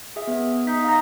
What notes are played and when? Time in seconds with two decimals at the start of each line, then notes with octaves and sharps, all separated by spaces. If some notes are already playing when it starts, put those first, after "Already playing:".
0.16 G#4 E5
0.27 B3
0.67 D#4 B6
0.84 F5 A#5 A#6